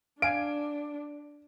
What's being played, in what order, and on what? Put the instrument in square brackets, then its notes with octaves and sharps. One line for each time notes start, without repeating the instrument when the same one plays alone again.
[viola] D4 [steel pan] F5 G#5 [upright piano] D7